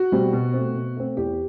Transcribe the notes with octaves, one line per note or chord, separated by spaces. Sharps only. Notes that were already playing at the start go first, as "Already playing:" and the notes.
Already playing: F#4
B2 G3 C4
B2
A3 C4
B2
A3 C4
E2 G4